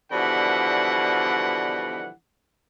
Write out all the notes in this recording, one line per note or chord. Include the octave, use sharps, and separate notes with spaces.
B2 D3 E3 F3 G3 F#5